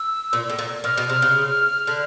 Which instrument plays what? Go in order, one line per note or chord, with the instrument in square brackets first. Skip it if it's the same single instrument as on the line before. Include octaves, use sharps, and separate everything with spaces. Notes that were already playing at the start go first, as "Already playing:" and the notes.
Already playing: [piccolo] E6
[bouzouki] A#2
A2
A#2
[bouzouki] A#2 [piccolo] F6
[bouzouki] B2
C3
C#3
D3